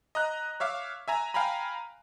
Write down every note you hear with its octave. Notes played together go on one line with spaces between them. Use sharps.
D#5 A#5 F#6
C#5 E5 F5 D6
E5 G#5 A#5
F5 G5 G#5 A#5 B5